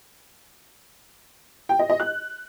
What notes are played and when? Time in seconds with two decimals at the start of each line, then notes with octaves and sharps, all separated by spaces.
1.69 G5
1.79 D#5
1.90 D#5
2.00 F#6